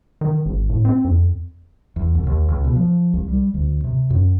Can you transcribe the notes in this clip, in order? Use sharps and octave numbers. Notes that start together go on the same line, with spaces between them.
D#3
G#1
A2
C4
F2
E2
C2
D#2
C#2
B2
F3
C2
G3
D2
C3
F#2